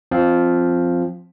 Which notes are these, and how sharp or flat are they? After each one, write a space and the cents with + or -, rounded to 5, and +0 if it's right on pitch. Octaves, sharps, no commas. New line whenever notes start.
F3 +0 C4 +0